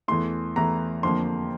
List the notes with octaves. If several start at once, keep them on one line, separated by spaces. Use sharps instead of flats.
E2 E3 A3 C6
E2 E3 A3 A#5
F2 D3 F3 A#3 C6